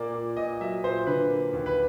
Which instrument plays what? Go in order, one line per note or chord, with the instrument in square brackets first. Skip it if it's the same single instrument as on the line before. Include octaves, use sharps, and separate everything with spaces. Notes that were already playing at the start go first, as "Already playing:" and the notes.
Already playing: [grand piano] A#2 A#3 D5
A#2
A#2 D#5
F#3 E5
A#2 C5
D3 B4
A#3
D#2
B4